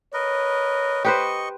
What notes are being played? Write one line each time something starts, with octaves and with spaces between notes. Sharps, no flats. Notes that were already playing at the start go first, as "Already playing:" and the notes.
A#4 B4 C#5 D#5
G4 B4 C5 D#5 C#6